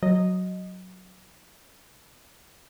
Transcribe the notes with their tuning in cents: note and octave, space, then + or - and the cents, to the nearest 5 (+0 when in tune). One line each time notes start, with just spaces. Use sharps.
F#3 +0 D#5 +0